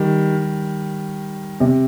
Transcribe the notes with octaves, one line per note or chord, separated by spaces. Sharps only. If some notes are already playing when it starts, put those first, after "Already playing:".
Already playing: D#3 G3
C3